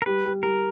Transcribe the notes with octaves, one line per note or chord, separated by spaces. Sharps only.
A#4
G3 B4
G3
G3 A#4